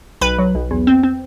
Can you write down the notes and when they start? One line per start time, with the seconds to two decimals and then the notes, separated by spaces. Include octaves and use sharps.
0.21 B1 B4 B5
0.39 F#3
0.55 B1
0.71 E2
0.87 C4
1.03 C4